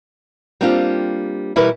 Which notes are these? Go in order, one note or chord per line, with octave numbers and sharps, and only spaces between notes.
G3 A#3 C4 D4 F4 G4
B2 E3 G3 E4 A#4 B4